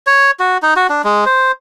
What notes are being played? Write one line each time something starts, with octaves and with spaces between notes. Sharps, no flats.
C#5
F#4
D#4
F#4
D4
G#3
C5